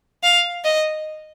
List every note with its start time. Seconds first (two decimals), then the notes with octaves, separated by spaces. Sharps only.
0.23 F5
0.65 D#5